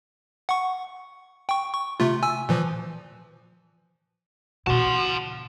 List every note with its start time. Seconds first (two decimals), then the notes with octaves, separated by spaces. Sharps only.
0.49 F#5 C#6
1.49 G5 C#6
1.73 C#6
2.00 C3 A3 F4
2.23 G#5 E6
2.49 A#2 E3 F3
4.67 A#2 C#3 F#4 A5 C6